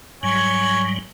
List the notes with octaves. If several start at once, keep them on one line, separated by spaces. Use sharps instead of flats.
G#2 F#3 G3 C#5 G#5